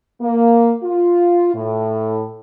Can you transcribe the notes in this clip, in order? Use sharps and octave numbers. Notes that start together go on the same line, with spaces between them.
A#3
F4
A2